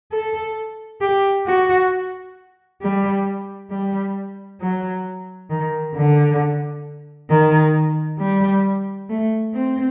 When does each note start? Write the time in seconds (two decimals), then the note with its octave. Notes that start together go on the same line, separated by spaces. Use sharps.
0.12 A4
1.01 G4
1.47 F#4
2.81 G3
3.70 G3
4.61 F#3
5.50 D#3
5.95 D3
7.30 D#3
8.19 G3
9.09 A3
9.54 C4